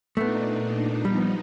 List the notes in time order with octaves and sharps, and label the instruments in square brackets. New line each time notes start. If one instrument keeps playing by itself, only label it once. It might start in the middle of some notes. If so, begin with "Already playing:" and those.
[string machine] A#2 D4 D#4 [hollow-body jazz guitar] A3 B3
[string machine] F3 B3 D#4 [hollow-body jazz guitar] G3